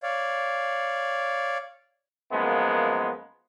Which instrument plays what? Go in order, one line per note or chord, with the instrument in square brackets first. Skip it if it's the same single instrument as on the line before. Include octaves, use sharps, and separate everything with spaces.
[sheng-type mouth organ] C#5 D5 F5
[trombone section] F#2 F3 G#3 A#3 B3